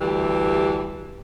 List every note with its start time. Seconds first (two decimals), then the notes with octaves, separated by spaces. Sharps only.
0.01 D2 E3 G3 G4